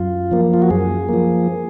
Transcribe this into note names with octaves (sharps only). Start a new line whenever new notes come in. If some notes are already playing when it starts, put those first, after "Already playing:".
Already playing: F#2 F4
F3 A#3
F4
F#4
F#2 G#4
F3 A#3